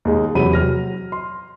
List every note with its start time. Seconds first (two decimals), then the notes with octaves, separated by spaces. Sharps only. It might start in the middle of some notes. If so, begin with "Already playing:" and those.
0.05 D#2 G#3
0.35 E2 C3 F#3 B5 D#7
0.53 F#3 F6 A#6
1.12 C6